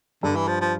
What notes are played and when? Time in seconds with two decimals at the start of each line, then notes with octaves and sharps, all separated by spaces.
0.23 G2 D3
0.36 E3
0.48 F3
0.61 F3